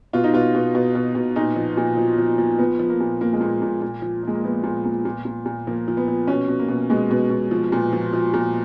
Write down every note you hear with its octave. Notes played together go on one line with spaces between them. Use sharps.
B2 F4
D#4
B2 F4
B2
B2
B2
B2
A#2 D#4
F3
A#2
F3
F3
F3
F3 B3
F3
A#3
A#2
A#2 A#3
G#3
A#2
A#3
A#2
A#2
F3
F3 G#3
A#3
F3 B3
A#2
A#2
A#2
A#2
A#2
F3 A#3
F3
B3
F3
B2 C#4
B2
A#3
B2
B2 G#3
B2
B2
F3
A#2
F3
F3
A#2